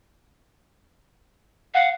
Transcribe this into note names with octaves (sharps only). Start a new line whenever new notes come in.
F5 F#5